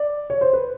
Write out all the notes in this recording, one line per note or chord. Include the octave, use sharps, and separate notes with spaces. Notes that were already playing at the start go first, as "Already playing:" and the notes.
Already playing: D5
C#5
C5
B4